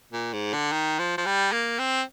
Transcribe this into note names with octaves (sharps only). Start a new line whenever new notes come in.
A#2
G#2
D3
D#3
F3
F3
G3
A#3
C4